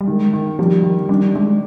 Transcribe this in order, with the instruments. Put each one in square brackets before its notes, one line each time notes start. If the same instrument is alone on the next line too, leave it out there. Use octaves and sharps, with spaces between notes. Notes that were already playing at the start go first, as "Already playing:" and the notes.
[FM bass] G3
[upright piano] D#3 [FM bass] G#3
[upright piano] D#3
[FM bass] F3 [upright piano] G3
[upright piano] D#3
[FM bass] G3 [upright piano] D4
[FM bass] G#3 [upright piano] D4